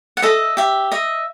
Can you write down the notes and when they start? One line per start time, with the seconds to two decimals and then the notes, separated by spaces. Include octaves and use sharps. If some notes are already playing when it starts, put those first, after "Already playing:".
0.17 F#5
0.22 A4 D#5 E5
0.57 G4 E5
0.92 D#5 E5